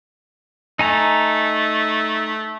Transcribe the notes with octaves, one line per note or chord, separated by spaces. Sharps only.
A3 D#4 G#5 A#5